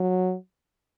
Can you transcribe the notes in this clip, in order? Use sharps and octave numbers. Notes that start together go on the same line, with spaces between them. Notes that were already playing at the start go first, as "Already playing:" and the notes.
Already playing: F#3